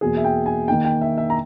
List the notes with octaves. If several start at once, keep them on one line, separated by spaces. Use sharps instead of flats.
E2 B2 A#3 G#4
E5
G5
G#5
D#3 A#3 D#4 G5
G5
E5
E5
A#5